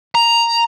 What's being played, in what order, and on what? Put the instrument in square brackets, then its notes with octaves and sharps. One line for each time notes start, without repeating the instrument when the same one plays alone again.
[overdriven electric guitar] A#5